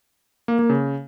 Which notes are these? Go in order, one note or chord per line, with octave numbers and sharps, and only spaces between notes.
A#3
A#3
C#3